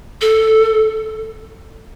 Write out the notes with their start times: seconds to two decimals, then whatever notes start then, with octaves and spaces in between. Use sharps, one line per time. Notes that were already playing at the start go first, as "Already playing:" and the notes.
0.21 A4